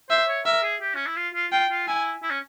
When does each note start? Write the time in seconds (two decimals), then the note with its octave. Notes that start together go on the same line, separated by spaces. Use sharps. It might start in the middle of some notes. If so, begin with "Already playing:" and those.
0.10 C5 E5
0.28 C#5
0.46 A#4 E5
0.63 G#4
0.81 G4
0.95 C#4
1.06 E4
1.16 F4
1.34 F4
1.52 F4 G5
1.70 F4
1.87 E4 G#5
2.23 E4
2.31 C#4